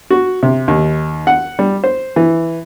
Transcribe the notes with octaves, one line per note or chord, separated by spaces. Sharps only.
F#4
C3
D#2
F#5
G3
C5
E3